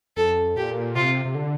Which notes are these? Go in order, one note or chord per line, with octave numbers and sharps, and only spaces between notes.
F2 A4
A#2 G4
C3 F4
C3
D3